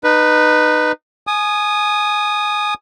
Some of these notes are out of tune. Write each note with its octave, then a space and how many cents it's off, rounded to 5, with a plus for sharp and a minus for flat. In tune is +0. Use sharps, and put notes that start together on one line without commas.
D#4 -25 B4 +0
G#5 +15 D#6 -15